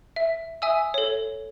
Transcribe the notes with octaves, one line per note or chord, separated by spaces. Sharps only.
E5
E5 G#5 D#6 E6
A4 C#5